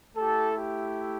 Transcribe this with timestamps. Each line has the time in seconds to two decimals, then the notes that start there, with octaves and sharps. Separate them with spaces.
0.16 A3 E4 G4 A4
0.54 G4